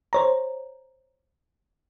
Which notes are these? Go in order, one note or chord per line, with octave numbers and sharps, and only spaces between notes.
C5 C#5 A#5